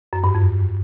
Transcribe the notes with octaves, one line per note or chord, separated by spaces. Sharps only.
F#2
G2
F2